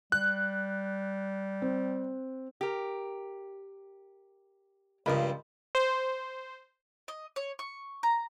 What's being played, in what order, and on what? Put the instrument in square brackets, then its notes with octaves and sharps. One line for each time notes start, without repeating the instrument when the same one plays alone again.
[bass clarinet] G3 [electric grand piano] F#6
[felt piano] C4
[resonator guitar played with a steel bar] G4 A#4
[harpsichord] C#2 G2 [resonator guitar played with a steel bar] C#3 F3 [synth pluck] A#4 D#5 B5
[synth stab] C5
[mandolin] D#5
C#5
C#6
A#5